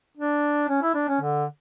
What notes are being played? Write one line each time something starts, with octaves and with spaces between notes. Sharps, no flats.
D4
C#4
E4
D4
C#4
D3